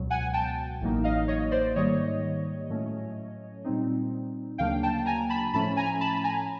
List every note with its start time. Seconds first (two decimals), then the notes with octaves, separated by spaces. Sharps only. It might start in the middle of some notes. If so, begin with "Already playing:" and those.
Already playing: C#2 B2 F#3
0.10 F#5 G#5
0.33 G5 A5
0.81 A1 A2 F#3 A#3 D#4
1.04 D#5 F5
1.28 C#5 D#5
1.51 C5 D5
1.75 G#2 D#3 G3 A#3 C#5 D#5
2.70 A2 F#3 A3 C#4
3.64 A#2 G3 C4 D#4
4.58 D2 C#3 F#3 A#3 D4 F5 G5
4.83 G5 A5
5.06 G#5 A#5
5.29 A5 B5
5.53 A2 F3 A3 C#4 A5 B5
5.77 G#5 A#5
6.01 A5 B5
6.24 G#5 A#5